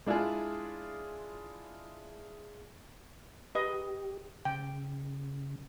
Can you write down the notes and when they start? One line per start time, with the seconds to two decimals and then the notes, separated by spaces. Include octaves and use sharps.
0.06 G#3 D4 E4 F4 G#4
3.55 G4 B4 D#5
4.45 C#3 G5